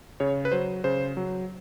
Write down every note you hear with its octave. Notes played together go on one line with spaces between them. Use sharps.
C#3 C#5
B4
F#3 C5
C#3 C5
F#3